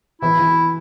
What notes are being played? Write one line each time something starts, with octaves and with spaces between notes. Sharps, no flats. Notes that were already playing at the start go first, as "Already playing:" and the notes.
E3 E4
E3